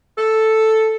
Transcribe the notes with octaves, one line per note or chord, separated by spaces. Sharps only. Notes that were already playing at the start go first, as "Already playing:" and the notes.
A4